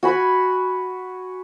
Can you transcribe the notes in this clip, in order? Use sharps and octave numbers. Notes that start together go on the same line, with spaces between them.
F#4 G#5 B5